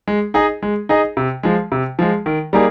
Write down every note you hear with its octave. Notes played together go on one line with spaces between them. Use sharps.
G#3
D#4 G#4 D#5
G#3
D#4 G#4 D#5
C3
F3 G#3
C3
F3 G#3
D#3
G3 A#3 D#4 G#4